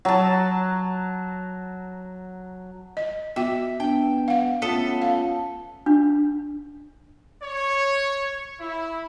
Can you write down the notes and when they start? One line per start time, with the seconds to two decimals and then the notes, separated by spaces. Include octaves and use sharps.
0.05 F#3 A5
2.97 D#5
3.36 B3 F#4 E5 G5
3.80 B3 D4 G5
4.28 F5 F#5
4.62 A3 B3 C#4 F4 A4
5.02 F5
5.86 D4
7.43 C#5
8.61 E4